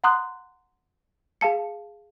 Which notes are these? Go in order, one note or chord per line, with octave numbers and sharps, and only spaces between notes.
F#5 A#5 C6 D#6 F#6
G#4 F5 A5 C#7